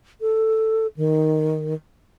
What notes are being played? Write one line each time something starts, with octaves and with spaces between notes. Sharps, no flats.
A4
D#3